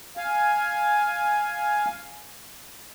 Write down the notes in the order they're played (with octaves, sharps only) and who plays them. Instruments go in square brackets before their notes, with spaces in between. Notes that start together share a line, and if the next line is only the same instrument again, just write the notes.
[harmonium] F5 G#5